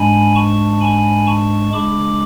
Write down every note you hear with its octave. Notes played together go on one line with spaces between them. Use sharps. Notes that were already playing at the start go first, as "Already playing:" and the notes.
Already playing: G#2 G#3 D4 G#5 B5
A5 C#6
G#5 B5
A5 C#6
C#3 G#3 D4 B5 D6